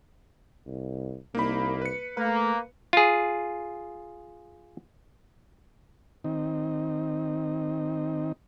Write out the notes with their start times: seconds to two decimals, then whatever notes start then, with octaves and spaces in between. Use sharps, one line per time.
0.66 C2
1.35 C2 A#3 D#4 B5
1.82 B4 C#7
2.17 A3 A#3 B4
2.93 F4 G#4
6.24 D#3 C4 D#4